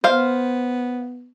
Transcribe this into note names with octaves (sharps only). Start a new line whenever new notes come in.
B3 C5 F5